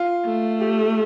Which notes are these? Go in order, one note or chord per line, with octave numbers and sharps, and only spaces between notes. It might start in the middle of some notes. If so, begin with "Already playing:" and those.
Already playing: F4
A3
G4